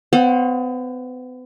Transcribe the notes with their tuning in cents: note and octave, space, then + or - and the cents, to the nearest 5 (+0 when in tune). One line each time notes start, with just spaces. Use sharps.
B3 +40 C5 +40 F#5 -35